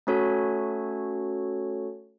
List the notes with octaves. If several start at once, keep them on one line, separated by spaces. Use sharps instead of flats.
A3 C#4 F#4 A4 C#5